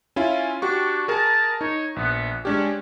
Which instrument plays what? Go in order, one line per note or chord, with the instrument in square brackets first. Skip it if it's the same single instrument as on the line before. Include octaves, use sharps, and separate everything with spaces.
[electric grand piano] C#4 E4 F4
[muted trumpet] D4 [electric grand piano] F#4 G4 C#6
[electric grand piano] G#4 A#4 [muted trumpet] A5
[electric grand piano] D#4 [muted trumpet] C#5
[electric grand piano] A#1 [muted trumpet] B3
[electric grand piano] G#3 D4 G4 [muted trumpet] C#4